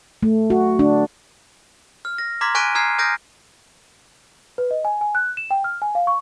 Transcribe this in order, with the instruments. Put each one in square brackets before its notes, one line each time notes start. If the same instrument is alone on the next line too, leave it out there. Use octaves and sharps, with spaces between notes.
[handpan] A3
F#4
D4
[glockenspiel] F6
A#6
A#5 C6 D6 F6 G#6 B6
G#5 C#6 F#6 B6 D7 D#7
A#5 D#6 F6 G#6 C7
G#5 D#6 F6 G6 A#6 D7
[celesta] B4
D#5
G#5
G#5
F#6
E7
G5
F6
G#5
F5
C#6